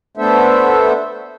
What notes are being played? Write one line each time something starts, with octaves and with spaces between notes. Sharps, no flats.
A3 B3 D4 A4 C5 E5